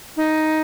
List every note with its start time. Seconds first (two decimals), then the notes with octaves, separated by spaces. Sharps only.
0.17 D#4